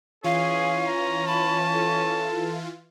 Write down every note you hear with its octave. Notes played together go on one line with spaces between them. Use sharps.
E3 C#4 F4 G#4 F5
A#5
A5 B5
A4